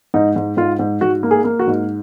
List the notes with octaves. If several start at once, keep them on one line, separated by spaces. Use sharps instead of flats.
G#2 D#4
G#2
G#2 F4
G#2
G#2 F#4
A#3
G#4
A#3
F#4
G#2